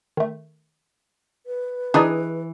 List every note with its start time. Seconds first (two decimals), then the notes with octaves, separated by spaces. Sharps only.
0.17 D#3 A3
1.46 B4
1.94 E3 D4 D#4 G4 G#4 D5 D#5